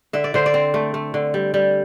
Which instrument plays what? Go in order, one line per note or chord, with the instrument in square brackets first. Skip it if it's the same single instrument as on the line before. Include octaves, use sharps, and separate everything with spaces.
[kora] D3 E5
D5
D3 C5
D5
C4
A3
A3
D3
G3
G3